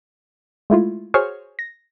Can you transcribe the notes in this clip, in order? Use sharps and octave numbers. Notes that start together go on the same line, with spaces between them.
G#3 A3 E4 F4
F#4 G#4 C5 C#5 C#6 F6
A#6